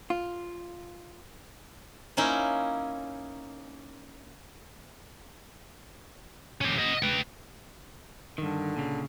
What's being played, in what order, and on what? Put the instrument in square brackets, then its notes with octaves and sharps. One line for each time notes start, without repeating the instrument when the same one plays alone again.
[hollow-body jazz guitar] F4
[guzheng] A#3 C#4 D#4 E4
[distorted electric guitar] C#4 G4
D#5 F#5
B4 G5
[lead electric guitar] G2 D#3 [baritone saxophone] D3
[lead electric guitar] A#2 C#3